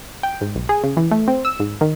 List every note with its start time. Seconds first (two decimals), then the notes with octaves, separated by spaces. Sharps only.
0.23 G5
0.41 G#2
0.55 B1
0.69 G#4
0.84 C#3
0.97 E3
1.11 A3
1.28 C4
1.45 E6
1.60 G#2
1.81 D#3